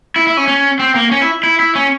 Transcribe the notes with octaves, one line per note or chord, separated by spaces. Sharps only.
E4
E4
C#4
C#4
C4
A#3
C#4
E4
E4
E4
C#4